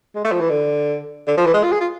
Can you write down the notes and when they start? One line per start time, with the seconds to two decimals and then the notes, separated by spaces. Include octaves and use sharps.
0.15 G#3
0.24 A3
0.32 F3
0.40 E3
0.50 D3
1.27 D3
1.37 F3
1.46 E3
1.54 G#3
1.63 F4
1.72 G#4
1.81 F4